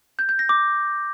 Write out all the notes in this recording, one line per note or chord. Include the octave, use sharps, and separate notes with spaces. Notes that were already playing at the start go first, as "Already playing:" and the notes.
G6
G6
A#6
D6